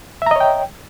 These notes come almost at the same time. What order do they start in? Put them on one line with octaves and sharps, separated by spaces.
E5 A#5 D#5 C#5 G5